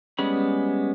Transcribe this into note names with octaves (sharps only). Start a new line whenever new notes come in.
G3 G#3 B3 C#4 B5